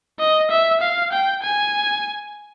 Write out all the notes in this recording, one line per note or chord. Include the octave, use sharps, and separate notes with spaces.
D#5
E5
F5
G5
G#5